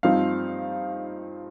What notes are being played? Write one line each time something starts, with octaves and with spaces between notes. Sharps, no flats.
G2 F3 C4 D#4 F5